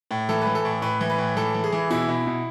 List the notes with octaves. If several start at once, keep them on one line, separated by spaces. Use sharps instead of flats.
A2
E3 A4
E3 B4
A4
A2
A2 B4
E3
B4
A2
E3 A4
E3
G#4
E3
B2 E4
B2
B2